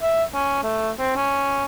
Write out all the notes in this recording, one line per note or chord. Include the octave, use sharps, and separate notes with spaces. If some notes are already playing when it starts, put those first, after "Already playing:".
E5
C#4
A3
C4
C#4